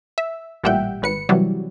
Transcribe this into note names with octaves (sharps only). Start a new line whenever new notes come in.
E5
A1 A#2 G3 E5 F#5 G5
G#1 B4 C#7
C3 E3 F#3 G3